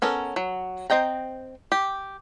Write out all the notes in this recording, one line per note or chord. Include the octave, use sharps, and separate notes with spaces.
B3 C#4 A4 A#4
F#3
C4 D#5 G5 A#5
G4